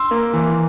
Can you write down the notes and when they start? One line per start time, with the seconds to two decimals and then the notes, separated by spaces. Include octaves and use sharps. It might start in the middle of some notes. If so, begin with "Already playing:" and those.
Already playing: C6 E6
0.11 A#3
0.33 E3